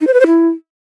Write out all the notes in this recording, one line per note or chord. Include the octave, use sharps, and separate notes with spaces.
D#4
C5
B4
C5
E4